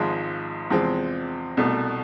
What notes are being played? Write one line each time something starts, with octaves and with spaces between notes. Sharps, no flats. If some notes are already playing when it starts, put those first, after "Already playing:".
Already playing: G#1 G#2 F3 G#3
E2 C3 F3 G#3 C4
C2 B2 A3